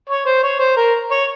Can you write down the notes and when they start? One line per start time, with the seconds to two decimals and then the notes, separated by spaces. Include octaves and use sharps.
0.09 C#5
0.26 C5
0.43 C#5
0.60 C5
0.77 A#4
1.11 C#5